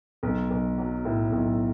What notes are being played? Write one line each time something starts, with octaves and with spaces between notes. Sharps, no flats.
B1
B1
F#3
A2
B1